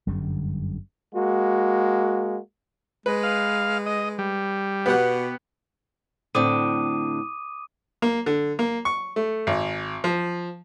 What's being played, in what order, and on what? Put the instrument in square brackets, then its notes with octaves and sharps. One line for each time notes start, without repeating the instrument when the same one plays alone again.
[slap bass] G1 F#2 D3 G3
[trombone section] G#3 A#3 F#4
[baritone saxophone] G#3 [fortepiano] B4
[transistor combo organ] F5
D#5
G3
[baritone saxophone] B2 [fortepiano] B3 G4 F#5
[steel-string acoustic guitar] A2 D3 C4 [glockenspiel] D6 D#6 D#7
[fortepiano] A#3
D3
A#3
C#6
A3
G#1
F3